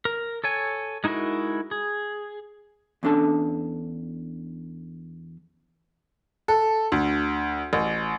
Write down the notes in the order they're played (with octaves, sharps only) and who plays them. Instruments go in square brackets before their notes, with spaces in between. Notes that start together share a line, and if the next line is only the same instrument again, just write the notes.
[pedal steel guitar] A#4
A4 C#5 G#5
G#3 D#4 E4 F#4 A#4
G#4
[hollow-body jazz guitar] E2 C#4 D4 A4 A5
[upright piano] A4
D2
A1